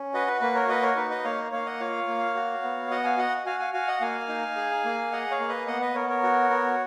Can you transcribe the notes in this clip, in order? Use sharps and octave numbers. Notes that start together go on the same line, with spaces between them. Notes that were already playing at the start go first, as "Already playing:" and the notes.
Already playing: C#4
F#4 B4 D#5
B4
A#3 B4
A#4 C#5
F#4 B4 D#5
A#4 C#5
D#4 B4
B4 D#5
A#3 C#5 F5
A#3 C#5 F5
D#5 F#5
F4 C#5 F5
A#3
F#4
B3
F#4 D#5 F#5
F5 G#5
F#4 D#5 F#5
F#4 F5 G#5
F5 G#5
F#4 F5 G#5
D#5 F#5
A#3 F5 G#5
D#4
G#4
A#3
G#4 D#5 F#5
C#5 F5
A#3
B4 D#5
B3 D#5 F#5
B4 D#5
B3 A#4 C#5
A#4 C#5
F#4
B3